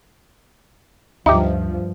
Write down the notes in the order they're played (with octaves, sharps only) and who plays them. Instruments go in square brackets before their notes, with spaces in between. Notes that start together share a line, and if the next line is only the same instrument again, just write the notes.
[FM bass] D2 [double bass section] G2 F3 [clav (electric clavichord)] D#4 G4 [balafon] E5